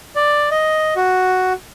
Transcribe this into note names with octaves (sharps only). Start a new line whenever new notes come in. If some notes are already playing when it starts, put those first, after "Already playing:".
D5
D#5
F#4